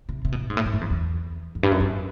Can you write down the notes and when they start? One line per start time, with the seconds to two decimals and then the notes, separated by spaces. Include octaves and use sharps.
0.09 C3
0.25 C3
0.32 B2
0.41 A#2
0.50 G#2
0.57 A2
0.66 G#2
0.73 G2
0.81 F2
0.90 E2
1.55 F2
1.63 G2
1.72 F#2
1.80 G2